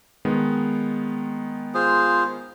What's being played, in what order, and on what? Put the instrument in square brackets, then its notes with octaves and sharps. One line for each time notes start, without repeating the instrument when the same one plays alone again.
[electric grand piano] D#3 G#3 B3
[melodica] F4 G#4 C5